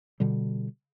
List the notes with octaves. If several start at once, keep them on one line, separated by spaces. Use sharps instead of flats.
B2 D3 G3